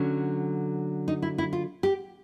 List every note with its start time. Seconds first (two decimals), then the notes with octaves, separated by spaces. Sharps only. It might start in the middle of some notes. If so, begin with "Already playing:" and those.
Already playing: D3 F#3 A3 C#4
1.08 D#4
1.22 E4
1.38 E4
1.53 F4
1.83 G4